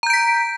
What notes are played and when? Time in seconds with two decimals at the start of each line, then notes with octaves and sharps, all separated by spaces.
0.03 A#5
0.07 G6
0.10 D7
0.13 B6